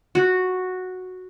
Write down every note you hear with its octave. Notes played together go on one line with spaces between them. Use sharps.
F#4